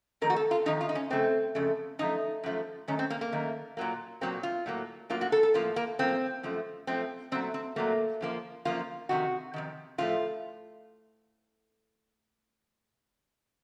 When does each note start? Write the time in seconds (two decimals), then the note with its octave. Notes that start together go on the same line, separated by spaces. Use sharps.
0.21 F2 D#3 A3 A#4
0.30 F#4
0.36 A4
0.51 F4
0.66 F2 D#3 A3 D#4
0.81 F4
0.89 D#4
0.95 C#4
1.10 F2 C#3 A3 C4
1.55 F2 C#3 A3
1.99 F#2 F3 A3 D#4
2.43 F#2 F3 A3
2.88 F#2 D#3 A3 C#4
2.99 C4
3.10 A#3
3.21 A#3
3.32 F#2 D#3 A3
3.77 A#2 F#3 A#3
4.21 A#2 F#3 A#3 C4
4.43 F4
4.66 A2 F#3 A#3
5.10 A2 F#3 A#3 F4
5.21 F#4
5.32 A4
5.43 A4
5.54 A2 F3 A#3 F4
5.76 A#3
5.99 A2 F3 A#3 C4
6.43 F#2 F3 A3
6.87 F#2 F3 A3 C4
7.32 A#2 F#3 A3 C4
7.54 C4
7.76 A#2 F#3 A3 A#3
8.21 F#2 F3 A#3
8.65 F#2 F3 A#3 F4
9.09 F2 C3 D#3 F#4
9.54 F2 C3 D#3
9.98 A2 F3 A3 F4